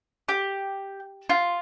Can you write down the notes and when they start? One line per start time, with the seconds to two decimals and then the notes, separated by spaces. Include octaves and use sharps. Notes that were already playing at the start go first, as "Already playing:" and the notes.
0.28 G4
1.29 F4